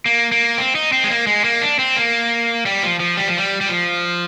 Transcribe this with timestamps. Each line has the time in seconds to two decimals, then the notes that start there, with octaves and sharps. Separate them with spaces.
0.06 A#3
0.32 A#3
0.58 C4
0.75 D#4
0.92 C4
1.04 G#3
1.10 A#3
1.27 G#3
1.44 A#3
1.61 D4
1.79 C4
1.96 A#3
2.66 G3
2.82 F3
3.00 F3
3.17 G3
3.28 F3
3.38 G3
3.61 G3
3.69 F3